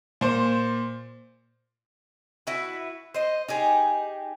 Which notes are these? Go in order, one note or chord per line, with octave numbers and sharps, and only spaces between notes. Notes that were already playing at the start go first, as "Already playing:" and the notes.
A#2 C5
E4 F#4 B4
C5 D#5
D#4 G4 G#4